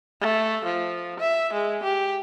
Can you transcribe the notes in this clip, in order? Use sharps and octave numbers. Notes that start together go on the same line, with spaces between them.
A3
F3
E5
G#3
G4